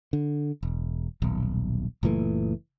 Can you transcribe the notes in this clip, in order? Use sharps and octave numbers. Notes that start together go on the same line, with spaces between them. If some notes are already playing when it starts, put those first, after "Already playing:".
D3
E1
D#1 B1
F#1 A#2 E3 A3